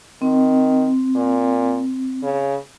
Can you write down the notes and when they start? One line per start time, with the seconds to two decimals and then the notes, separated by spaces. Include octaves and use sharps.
0.22 D#3 C4
1.15 A#2
2.22 C#3